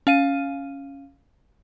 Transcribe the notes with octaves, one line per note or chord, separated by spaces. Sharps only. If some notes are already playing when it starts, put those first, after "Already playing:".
C#4 F5 D#7